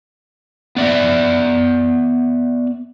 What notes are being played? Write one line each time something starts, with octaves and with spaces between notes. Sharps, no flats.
B3 D5 E5